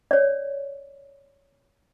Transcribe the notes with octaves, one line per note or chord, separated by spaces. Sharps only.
C#5 D5